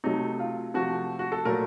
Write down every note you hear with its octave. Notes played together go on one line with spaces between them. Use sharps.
C3 F#3 A3 D#4
F4
C3 F3 A3 F#4
F#4
A4
A#2 F#3 A3 A#4